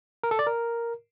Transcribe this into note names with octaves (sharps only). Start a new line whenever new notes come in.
A#4
A4
D5
A#4